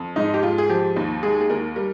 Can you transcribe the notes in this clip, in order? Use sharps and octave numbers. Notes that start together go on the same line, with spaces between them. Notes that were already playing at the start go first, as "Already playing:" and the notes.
Already playing: F2
G#2 D#4
G4
G#2 F4
G#4
F3 G4
D#2
G#3 G#4
G#4
D#2 A#4
G3 A#4